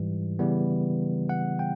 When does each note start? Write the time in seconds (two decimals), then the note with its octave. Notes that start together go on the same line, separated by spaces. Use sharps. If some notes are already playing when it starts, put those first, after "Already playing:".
Already playing: G#2 E3 G3
0.39 C#3 E3 G3 B3
1.29 F#5
1.59 G5